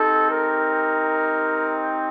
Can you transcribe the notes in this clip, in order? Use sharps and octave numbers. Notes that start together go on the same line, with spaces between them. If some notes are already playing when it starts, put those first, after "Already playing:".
Already playing: C4 D#4 G4 A4
A#4